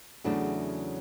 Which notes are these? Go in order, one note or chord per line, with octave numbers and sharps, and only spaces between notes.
E2 C#3 F#3 A3 D4